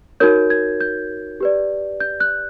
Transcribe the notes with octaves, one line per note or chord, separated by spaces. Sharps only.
D#4 F#4 A#4 C#5 G6
G#6
G6
G4 B4 D5
G6
F#6